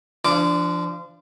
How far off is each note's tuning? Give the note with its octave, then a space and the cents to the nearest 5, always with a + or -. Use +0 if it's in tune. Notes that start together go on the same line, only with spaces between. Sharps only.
F3 -30 D4 +0 D6 +0